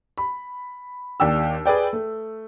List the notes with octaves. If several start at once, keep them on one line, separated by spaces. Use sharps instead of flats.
B5
D#2 D4 G4 E6
G#4 B4 D5 G5
A3